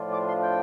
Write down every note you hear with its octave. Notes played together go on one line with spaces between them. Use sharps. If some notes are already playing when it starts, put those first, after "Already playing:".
Already playing: A2 F3 D4 F4
D6
C6
G5